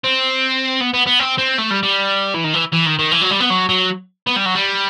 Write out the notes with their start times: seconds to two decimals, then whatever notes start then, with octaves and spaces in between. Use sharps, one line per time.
0.04 C4
0.81 B3
0.94 B3
1.06 B3
1.19 C4
1.38 C4
1.58 A3
1.71 G3
1.83 G3
2.34 E3
2.44 D#3
2.53 E3
2.72 E3
2.86 D#3
2.99 D#3
3.12 E3
3.22 F#3
3.31 G3
3.40 B3
3.50 F#3
3.69 F#3
4.27 B3
4.36 G3
4.46 F#3
4.55 G3